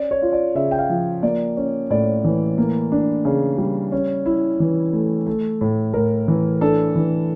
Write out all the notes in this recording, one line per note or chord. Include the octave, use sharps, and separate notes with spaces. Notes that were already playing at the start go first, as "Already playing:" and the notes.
Already playing: C#4 D5
C#5
F4
D5
C#3 E5
G5
F5
F3
A#3 D5
C#4
A2 D5
E3
A#3
D4
C#3
G3
C#4
E4
E3
A3
A3
A2
A2 A#4
E3
D4 A4
E3